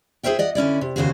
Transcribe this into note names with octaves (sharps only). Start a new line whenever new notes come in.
G#4 A#4 C5 E5 G5
D5 D#5 F#5
D3 C#4 E4 D5
C3
D#2 A#2 C#3 F#4 G#4 C5